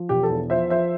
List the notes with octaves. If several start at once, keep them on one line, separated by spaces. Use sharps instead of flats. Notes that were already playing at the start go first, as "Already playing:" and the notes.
Already playing: F3
E1 G4
A4
E2
F3 C5 E5
F3 C5 E5